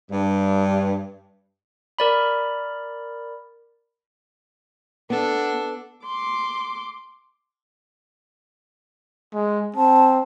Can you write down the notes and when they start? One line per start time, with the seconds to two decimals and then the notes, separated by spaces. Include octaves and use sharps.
0.11 G2
1.99 A#4 D5 B5
5.10 B3 D4 A4
6.06 C6 D6
9.34 G#3
9.76 C4 A5